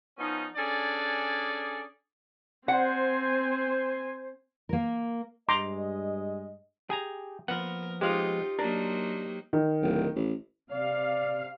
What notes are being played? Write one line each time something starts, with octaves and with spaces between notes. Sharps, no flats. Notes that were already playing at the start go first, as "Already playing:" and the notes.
F3 B3 C#4 D#4
C#4 D4 G#4 A4 D5
C4 C5 F#5 G#5
A#3 A#4
G2 G#3 D#5 A#5 C6 D6
G4 G#4 G#5 A#5
F3 A#3 B3 A#4 F#5
G#3 D#4 F4 G4 C5 F5
F#3 A#3 D4 D#4 A#4
D#3
D1
A1
C3 D5 F5